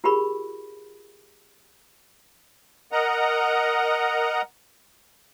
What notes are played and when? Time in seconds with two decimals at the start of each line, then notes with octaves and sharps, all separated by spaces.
0.04 F4 G4 G#4 A#4 B5 C#6
2.92 A#4 D#5 F#5 A#5